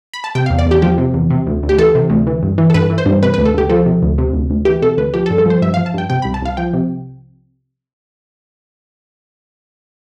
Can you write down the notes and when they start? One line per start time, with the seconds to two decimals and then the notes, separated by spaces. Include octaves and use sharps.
0.14 B5
0.24 A5
0.35 C3 G5
0.46 F5
0.50 E2
0.59 D5
0.66 E2
0.71 G4
0.82 F3 G4
0.98 C3
1.14 E2
1.30 C3
1.47 D2
1.63 D2
1.69 G4
1.78 E3 A4
1.95 C3
2.10 D2
2.27 E3
2.43 G2
2.58 E3
2.70 A4
2.74 G2 B4
2.90 E3
2.98 C5
3.06 G2
3.23 C3 B4
3.34 B4
3.38 D2
3.45 A4
3.54 D2 G4
3.70 F3 A4
3.86 C3
4.02 D2
4.18 C3
4.33 D2
4.50 D2
4.65 E3 G4
4.82 C3 A4
4.97 D2 B4
5.14 F3 G4
5.26 A4
5.30 G2
5.38 A4
5.46 F3 C5
5.62 G2 E5
5.74 F5
5.77 F3
5.86 A5
5.94 G2 G5
6.10 C3 G5
6.22 B5
6.25 C2
6.34 A5
6.42 C2 F5
6.57 F3 G5
6.73 C3